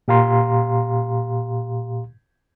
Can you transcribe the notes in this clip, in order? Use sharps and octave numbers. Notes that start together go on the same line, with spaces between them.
A#2 G4 F5 A#5 C6